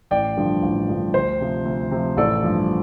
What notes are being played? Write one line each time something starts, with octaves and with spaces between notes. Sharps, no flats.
A1 D5 G5
G2 D3 F3
A1
G2 D3 F3
D2 C5
C3 F3
D2
C3
F3
A1 A4 D5
G2 F3